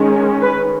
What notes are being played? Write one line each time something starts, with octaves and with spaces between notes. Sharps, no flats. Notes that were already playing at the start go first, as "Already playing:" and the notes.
Already playing: D#3 G#3 C#4
B4